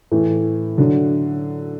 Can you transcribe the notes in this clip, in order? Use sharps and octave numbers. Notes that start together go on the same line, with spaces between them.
A2 E3 A3
D3 F#3